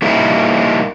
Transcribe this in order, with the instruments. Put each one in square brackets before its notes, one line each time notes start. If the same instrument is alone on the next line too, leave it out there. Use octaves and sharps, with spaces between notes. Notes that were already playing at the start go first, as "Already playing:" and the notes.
[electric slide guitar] G3 A#3 D#4 E4